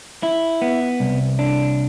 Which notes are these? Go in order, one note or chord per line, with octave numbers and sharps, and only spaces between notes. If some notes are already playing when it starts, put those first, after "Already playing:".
E4
B3
C2
D4